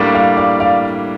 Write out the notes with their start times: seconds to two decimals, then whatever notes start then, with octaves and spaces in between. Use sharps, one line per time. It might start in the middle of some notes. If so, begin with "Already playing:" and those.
Already playing: A2 G3 A#3 D4
0.14 D5 F5
0.37 D5 F5
0.60 D5 F5